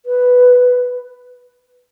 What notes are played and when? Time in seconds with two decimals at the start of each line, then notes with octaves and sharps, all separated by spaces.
0.06 B4